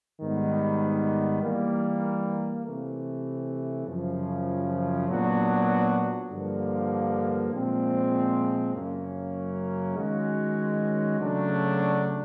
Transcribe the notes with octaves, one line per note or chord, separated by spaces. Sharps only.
G#2 D#3 G3 B3
E3 G3 A#3
C3 E3 A3
F#2 C#3 F3
A#2 F#3 B3 D4 F#4
G2 D3 F3 A#3
A#2 F3 G#3 C4
F#2 C#3 F#3 A#3 C#4
D#3 G#3 C#4 F#4
C#3 F#3 A3 D4